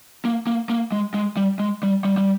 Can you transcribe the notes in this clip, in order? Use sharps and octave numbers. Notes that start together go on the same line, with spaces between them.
A#3
A#3
A#3
G#3
G#3
G3
G#3
G3
G3
G3